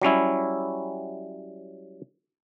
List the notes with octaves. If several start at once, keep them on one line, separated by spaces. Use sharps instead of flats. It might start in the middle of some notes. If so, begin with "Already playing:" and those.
F#3 G3 C#4 E4